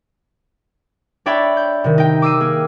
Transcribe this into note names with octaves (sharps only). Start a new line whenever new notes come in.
D4 C#5 D5 E5 G5 B5
G6
C3 D#3
D#4 G5
D6 E6 C7 D#7
A#3 G#4